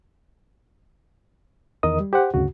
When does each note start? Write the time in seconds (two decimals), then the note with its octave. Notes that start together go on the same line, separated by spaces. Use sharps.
1.83 E2 D#3 A#4 D#5 D#6
2.00 G3
2.13 G4 C5 F#5
2.34 D2 G2 C#3 F#4